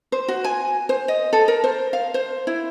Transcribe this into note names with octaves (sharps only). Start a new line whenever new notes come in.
C5
F#4
G#5
C5
D#5
A4
A#4
C5
F5
C5
E4